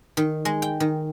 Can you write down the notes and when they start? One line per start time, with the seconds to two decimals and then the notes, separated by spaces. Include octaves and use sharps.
0.17 D#3
0.45 G#3
0.62 G5
0.80 D#3